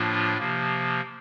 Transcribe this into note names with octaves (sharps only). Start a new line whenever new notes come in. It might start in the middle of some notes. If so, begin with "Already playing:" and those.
Already playing: A2 F3 A#3 D4 F4
C3 F3 A#3